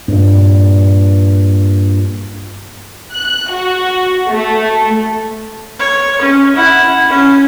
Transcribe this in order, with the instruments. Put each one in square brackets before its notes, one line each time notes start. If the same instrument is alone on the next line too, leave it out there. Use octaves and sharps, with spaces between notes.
[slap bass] G2 A#2
[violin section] F#6
F#4
A3
[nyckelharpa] C#5
C#4
E4 F#5
C#4